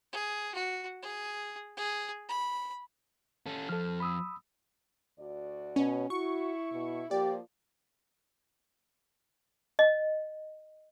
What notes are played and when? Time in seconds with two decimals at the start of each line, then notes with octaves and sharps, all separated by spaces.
0.12 G#4
0.55 F#4
1.02 G#4
1.77 G#4
2.29 B5
3.46 C#4 A4
3.69 F2 F3 A4 F6
4.00 B5 D#6 E6
5.19 D2 F#4 D5
5.76 B2 C#4
6.10 E4 F#4 C#6
6.73 B2
7.11 F3 A#3 G4 D5
9.79 D#5